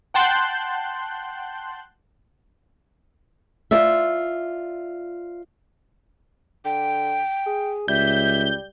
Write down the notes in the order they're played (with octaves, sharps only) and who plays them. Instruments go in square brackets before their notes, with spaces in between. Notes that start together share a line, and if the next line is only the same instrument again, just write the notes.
[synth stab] F#5 G5 A5 C6 F#6 G6
[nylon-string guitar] F4 C5 D5 E5
[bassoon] D3 [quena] G5
[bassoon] G#4
[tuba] C#2 [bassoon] G3 [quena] E5 [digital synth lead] G6